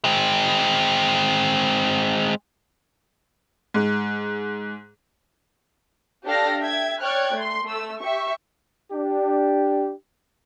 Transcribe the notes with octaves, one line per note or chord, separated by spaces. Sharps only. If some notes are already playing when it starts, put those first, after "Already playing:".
G#3 C4
G#2
D4 G4 A4 D5 F5 A#6
E5 G5 G#6
C#5 D5 G5 F6 F#6 G#6
A3 C6
A3 E6
G4 E5 C#6
D4 G4